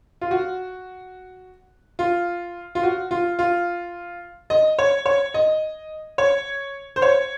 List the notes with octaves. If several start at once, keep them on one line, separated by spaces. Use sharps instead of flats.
F4
F#4
F4
F4
F#4
F4
F4
D#5
C#5
C#5
D#5
C#5
C5
C#5